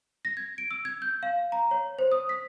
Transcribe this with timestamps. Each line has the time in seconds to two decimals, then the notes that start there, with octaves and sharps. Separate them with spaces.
0.25 A#6
0.37 G#6
0.58 D7
0.71 E6
0.85 G#6
1.02 G6
1.23 F5
1.52 A#5
1.71 C#5
1.99 C5
2.12 D#6
2.29 B6